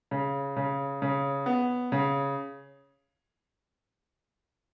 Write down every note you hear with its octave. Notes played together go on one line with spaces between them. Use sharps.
C#3
C#3
C#3
B3
C#3